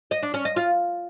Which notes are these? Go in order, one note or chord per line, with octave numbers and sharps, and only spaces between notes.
D#5
D4
C#4
D#5
F4